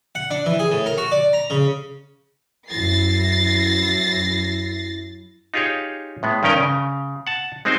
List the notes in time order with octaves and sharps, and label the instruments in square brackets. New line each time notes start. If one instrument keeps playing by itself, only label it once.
[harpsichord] F#5
D4
E3
G#4
A2
A#4
F#4
D5
A#5
C#3
[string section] F#2 E4 A6 A#6 C7
[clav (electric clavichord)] D#4 F4 G4 G#4 C#5
A2 G#3 B3
G2 D#3 C#4 A#4 G5 G#5
C#3
F#5 A5
G#3 C4 D#4 F#4 C5